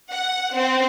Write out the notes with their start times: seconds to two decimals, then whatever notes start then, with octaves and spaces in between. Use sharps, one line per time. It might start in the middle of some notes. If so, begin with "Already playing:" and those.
0.10 F#5
0.56 C4